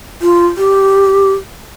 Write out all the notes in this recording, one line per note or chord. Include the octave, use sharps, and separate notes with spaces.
F4
G4